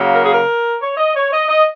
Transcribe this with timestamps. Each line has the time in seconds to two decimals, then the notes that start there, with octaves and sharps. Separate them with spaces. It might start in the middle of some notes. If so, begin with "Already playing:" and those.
Already playing: C#3 F#3 A#3
0.12 A#4
0.22 G#4
0.32 A#4
0.80 C#5
0.97 D#5
1.14 C#5
1.30 D#5
1.48 D#5